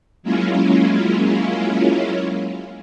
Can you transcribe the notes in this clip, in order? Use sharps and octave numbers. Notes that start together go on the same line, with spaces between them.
F#3 G#3 A#3 C#4 E4 F4